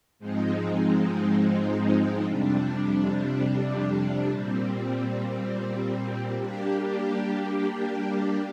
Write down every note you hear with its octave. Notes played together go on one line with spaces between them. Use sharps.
G#2 F3 G#3 C4 D#4
F2 C3 G3 D4
A#2 G3 C4
G3 A#3 D4 G4